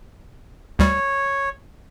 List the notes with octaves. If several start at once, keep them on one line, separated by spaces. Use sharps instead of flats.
D2 G3 C#5